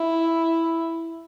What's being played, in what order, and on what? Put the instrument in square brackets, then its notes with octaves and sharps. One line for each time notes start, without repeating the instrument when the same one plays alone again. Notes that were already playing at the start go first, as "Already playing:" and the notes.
Already playing: [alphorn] E4